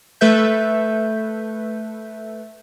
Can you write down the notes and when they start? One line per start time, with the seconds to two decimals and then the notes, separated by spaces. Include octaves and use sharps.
0.21 A3 A4 B4 E5 G6